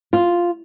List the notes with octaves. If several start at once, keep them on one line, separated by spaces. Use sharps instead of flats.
F4